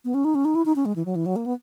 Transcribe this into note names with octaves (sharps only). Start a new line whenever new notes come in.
B3
C#4
D#4
C#4
D#4
E4
D#4
C#4
G#3
E3
F#3
E3
F#3
A#3
B3